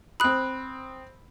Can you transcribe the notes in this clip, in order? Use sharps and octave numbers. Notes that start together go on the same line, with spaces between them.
C4 B5 D#6 F#6